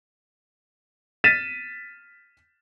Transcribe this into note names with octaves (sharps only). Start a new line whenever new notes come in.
F6 A6 B6 D#7 E7